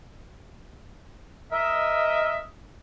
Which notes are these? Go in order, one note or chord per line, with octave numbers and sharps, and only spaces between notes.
A#4 D#5 E5